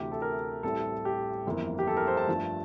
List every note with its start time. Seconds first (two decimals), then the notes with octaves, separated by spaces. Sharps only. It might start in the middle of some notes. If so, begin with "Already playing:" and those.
Already playing: D2 C3 E3 A3 G4
0.12 A4
0.22 A#4
0.63 A1 A2 G3 C4 A4
1.05 G4
1.45 G1 F2 E3 A#3
1.79 G4
1.87 A4
1.97 A#4
2.08 C5
2.17 A5
2.27 G2 F3 A3